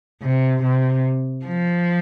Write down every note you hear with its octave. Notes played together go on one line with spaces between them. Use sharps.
C3
C3
F3